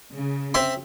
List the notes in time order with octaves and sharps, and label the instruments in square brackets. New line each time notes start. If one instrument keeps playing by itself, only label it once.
[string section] C#3
[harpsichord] C4 E5 C6